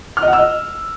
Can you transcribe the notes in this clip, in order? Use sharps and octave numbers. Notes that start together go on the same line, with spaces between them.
F6
D#5
F#5
E6
D#5